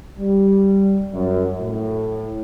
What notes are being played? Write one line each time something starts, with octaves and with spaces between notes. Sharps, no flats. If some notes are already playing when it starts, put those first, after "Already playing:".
G3
F#2
A2